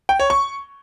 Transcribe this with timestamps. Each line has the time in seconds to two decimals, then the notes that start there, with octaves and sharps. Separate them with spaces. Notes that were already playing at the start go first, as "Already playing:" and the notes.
0.09 G5
0.20 C#5
0.30 C#6